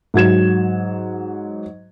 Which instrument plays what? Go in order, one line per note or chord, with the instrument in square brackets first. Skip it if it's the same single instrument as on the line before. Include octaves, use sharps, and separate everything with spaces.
[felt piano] G#2 F#3 G#6 E7